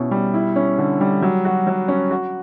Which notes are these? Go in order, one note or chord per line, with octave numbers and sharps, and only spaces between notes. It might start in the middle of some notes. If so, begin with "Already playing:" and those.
Already playing: B2 C#4 E4
G3
E4
C#4
D3
G3
F#3
F#4
F#3
C#4
F#4